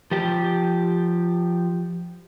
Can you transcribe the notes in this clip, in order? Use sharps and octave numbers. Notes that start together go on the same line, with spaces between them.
F3 G4